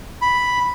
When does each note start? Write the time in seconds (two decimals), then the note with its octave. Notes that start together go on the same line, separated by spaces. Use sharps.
0.22 B5